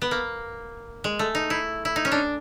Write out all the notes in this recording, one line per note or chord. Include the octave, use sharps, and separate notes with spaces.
B3
A#3
G#3
A3
D#4
E4
E4
D#4
C#4
D4